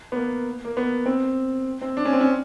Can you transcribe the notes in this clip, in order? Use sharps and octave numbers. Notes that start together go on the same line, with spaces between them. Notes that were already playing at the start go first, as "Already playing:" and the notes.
B3
A#3
A#3
B3
C4
C4
D4
C#4
C4
C#4